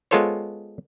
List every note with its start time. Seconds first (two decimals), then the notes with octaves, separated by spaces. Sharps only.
0.11 G#3 B3 F4 A4 C5 C#5